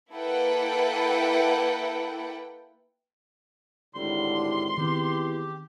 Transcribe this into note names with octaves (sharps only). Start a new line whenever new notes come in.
A#3 E4 A4 B4 F#5 G5
G#1 A2 D3 G3 C6
E2 D#3 C4 G4